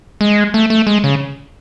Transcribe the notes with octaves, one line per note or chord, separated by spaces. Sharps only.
G#3
A3
A3
G#3
C#3